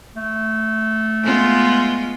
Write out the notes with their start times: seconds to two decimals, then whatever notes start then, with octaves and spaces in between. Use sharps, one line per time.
0.16 A3
1.23 G#3 B3 F4